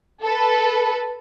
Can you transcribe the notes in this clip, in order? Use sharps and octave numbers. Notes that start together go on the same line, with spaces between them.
A4 B4